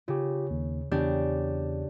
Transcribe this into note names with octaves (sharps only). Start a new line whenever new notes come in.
C#3 F4 G4
D#2
E2 C#3 D4 G4